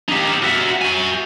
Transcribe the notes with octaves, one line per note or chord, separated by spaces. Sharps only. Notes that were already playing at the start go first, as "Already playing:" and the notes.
D#4 G4
F#4 E5
F#4 G#5